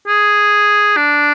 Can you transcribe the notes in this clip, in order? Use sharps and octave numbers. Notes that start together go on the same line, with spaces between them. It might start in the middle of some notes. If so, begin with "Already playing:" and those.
G#4
D4